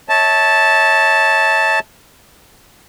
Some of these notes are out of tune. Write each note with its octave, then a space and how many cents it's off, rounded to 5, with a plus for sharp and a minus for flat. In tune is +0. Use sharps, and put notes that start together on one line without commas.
C#5 +0 E5 -40 A5 +0